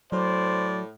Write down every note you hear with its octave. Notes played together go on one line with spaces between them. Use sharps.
A2 F#3 C5 D5